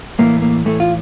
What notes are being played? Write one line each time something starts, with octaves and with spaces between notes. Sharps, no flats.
A2 E3 A#3
A#3
A2 E3 A3
F4